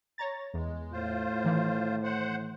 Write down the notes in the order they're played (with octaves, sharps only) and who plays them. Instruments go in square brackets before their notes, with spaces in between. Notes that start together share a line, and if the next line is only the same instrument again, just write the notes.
[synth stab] C#5 A#5 A6
[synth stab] E2 [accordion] G#3
[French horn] A2 [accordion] F4 C5
[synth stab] D#3 E3
[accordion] C5 F#5